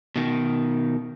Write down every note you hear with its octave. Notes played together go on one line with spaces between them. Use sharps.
B2 D#3